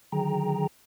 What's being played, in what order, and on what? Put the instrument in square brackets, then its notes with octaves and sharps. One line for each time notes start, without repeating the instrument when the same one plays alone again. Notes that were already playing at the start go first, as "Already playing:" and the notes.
[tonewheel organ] D3 D#3 F#3 G#4 G5 A#5